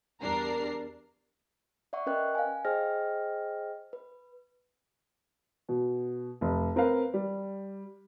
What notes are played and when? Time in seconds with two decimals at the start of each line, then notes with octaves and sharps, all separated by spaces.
0.21 E2 G3 D4 A#4 A#5 C7
1.93 D5 E5 F#5 C#6
2.06 C#4 A#4 B4 D#5 G5 F#6
2.35 F5 G#5
2.65 G#4 C5 D#5 G5 F6 A#6
3.93 B4
5.69 B2
6.41 F1
6.76 C4 A#4 B4 F5
7.14 G3